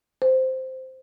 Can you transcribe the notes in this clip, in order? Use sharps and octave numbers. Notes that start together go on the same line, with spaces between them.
C5